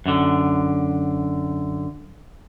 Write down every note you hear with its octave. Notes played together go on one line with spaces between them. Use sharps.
F#2 D3